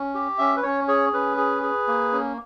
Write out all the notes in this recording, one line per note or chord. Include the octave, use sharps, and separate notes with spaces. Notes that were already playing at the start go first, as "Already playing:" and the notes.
Already playing: C#4
G4
C#4 E5
B4
C#4 C#5
G#4 C#5
C#4 B4
G#4
G#4
A#3
C#4